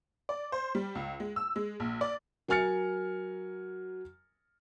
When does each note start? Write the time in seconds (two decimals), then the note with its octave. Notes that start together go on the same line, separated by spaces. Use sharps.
0.29 D5
0.52 C5
0.75 G3
0.95 C#2
1.20 G#3
1.36 E6
1.56 G#3
1.80 A#1
2.01 D5
2.48 F#3 A#4 G#5 F6 A6 C#7